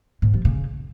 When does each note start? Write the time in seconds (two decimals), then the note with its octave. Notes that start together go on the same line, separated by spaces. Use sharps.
0.22 G#2
0.34 F3
0.45 C#3